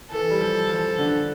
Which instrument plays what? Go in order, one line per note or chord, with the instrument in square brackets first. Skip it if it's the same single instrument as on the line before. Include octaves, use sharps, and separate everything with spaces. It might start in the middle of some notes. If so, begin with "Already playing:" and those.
[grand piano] E3 [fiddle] A4
[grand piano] G3
F3
F3
D3 D4